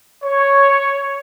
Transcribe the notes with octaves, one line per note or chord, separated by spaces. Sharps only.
C#5